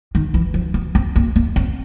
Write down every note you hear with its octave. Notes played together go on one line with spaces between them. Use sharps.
D#3
E3
F3
B3
C4
A#3
A#3
C4